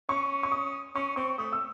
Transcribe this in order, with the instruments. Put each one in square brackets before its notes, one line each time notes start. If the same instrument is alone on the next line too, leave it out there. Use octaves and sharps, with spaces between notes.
[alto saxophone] C#4 [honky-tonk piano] C#6
[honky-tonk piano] C#6
D#6
[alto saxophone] C#4 [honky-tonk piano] C#6
[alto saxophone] C4 [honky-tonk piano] C#6
[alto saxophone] A3 [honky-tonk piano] D#6
[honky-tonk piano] E6